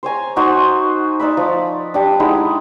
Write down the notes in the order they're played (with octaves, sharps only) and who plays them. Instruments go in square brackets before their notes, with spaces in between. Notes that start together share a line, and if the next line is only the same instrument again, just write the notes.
[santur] C5 C#5 G#5 A#5
D#4 F#4 C5
D#4 D5 E5 B5
F3 D5
D4 G4
G#3 D#4 E4 F#5